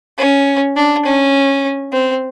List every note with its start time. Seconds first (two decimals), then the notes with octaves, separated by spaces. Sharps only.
0.18 C#4
0.76 D4
1.05 C#4
1.93 C4